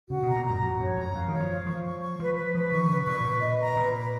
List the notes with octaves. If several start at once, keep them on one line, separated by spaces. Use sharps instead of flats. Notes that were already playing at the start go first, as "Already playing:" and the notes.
C#3 F#4
B2 A#5
A#2
F#2 A#5
F2 F#4
F#2 C#5
F2 A#5
F#2 F5
D#3 C#5
F3
F5
F3 C#6
C#6
C#6
F3 B4
B4
F3 B4
D#3 C#6
C#3 B4
A#2 C#6
A#2 B4
D#5
A#5
A#2 B4
B4